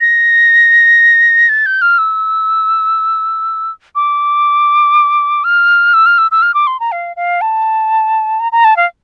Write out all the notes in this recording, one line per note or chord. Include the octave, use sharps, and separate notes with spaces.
A#6
A6
G6
F6
E6
D6
F6
E6
F6
E6
E6
F6
D6
C6
A#5
F5
F5
A5
A#5
A#5
A5
F5